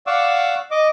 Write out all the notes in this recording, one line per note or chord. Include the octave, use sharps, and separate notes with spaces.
D5 F5 F#5 C#6 D6 E6
D#5 D6